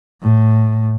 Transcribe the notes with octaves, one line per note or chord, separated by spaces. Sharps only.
A2